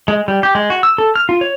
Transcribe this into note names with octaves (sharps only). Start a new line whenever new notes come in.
G#3
G3
G4
G#3
F#4
E6
A4
F6
F4
C#5